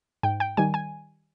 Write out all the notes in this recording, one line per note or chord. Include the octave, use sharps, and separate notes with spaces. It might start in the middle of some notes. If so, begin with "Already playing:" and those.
G#2 G5
G5
D#3 G3 G#5
G#5